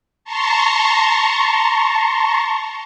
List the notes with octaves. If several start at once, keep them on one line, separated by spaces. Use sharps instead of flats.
A5 A#5 C6 C#6